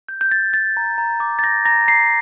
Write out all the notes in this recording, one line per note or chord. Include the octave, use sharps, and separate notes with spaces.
G6
G6
G6 A6
G6 A6
A#5
A#5
D6
A6
G6 A#6
A#5 A#6
A#5 C7